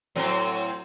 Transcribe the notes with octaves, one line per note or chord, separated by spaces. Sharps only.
A2 F#3 C4